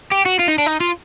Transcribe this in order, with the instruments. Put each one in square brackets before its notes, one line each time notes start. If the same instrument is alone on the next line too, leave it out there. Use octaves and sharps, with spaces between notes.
[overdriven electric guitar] G4
F#4
F4
D#4
D4
D#4
F4